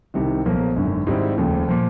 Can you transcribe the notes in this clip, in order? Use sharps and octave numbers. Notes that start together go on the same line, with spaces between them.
C2 C3 D#3
B1 A#2 F3 A#3
G#1 F#2 D3
G#2 D#3 G3 C4 E4
F1 D#2 C#3 F3
A#2 F3